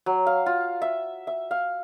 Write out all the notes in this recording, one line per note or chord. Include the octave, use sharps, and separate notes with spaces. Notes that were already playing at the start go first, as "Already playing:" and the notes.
F#3
F5
F4
E5
E5
F5